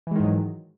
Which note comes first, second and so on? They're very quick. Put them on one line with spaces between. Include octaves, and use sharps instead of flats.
E3 G#3 D#3 G#2 F#3